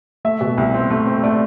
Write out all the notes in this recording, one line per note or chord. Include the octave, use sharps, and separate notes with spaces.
A3 E5
B2
C2
C4
A3
C4
A3 D5